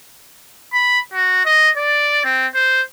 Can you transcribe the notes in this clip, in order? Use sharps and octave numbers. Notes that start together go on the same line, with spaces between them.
B5
F#4
D#5
D5
C4
C5